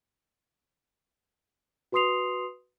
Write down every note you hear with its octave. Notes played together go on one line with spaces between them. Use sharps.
F#4 B4 C6 D#6 C7 F7